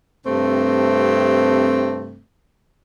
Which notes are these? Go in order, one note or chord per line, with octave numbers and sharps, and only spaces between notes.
G2 C3 A3 C4